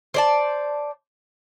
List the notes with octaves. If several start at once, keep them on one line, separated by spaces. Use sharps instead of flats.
C5 D5 A5